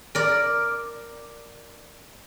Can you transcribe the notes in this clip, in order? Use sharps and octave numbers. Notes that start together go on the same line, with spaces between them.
A#4 D5